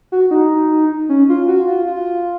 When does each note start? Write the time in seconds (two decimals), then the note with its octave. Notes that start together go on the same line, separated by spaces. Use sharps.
0.12 F#4
0.31 D#4
1.09 C#4
1.29 F4
1.48 F#4
1.67 F4
1.87 F4